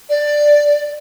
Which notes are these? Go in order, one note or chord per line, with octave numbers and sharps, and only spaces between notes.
D5